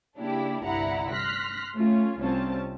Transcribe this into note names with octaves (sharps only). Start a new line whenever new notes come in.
C#3 A#3 D4 E4 G4
G1 C2 G2 E4 F#5 A#5
C6 F6 F#6 A#6 B6
A3 C#4 F4
C2 C4 C#4 F4 A5